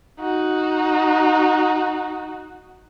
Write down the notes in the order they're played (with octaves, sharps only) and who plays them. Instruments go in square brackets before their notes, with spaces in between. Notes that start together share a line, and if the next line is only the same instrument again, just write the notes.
[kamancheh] D#4 F#4